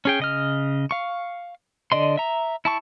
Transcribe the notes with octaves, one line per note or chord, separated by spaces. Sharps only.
C#4 G#4 G5
C#3 D#5 F6
F5 C#6
D3 D5 D#5 C6
E5 A#5
E4 A5 C#6